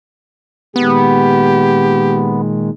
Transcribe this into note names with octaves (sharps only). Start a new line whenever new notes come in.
A#2 D#3 G#3 B3 G4